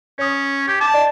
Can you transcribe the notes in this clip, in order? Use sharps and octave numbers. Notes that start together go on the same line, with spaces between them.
C#4 C#5 D#6
G4 G#6
A5 D6
D5 D#5